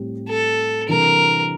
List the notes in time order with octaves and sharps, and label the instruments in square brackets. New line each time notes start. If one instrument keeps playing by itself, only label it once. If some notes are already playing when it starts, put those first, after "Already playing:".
Already playing: [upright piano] A2 G3 C4 G4
[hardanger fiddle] A4
[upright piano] C3 E3 G3 D4 [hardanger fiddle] A#4